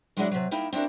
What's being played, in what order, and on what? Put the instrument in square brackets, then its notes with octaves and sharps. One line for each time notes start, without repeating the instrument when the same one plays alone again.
[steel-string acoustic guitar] F#3 G#3 C#4 D4 E4 F#4
C3 F#3
A#3 D#4 E4 G5
C4 D4 E4 F#4 A#4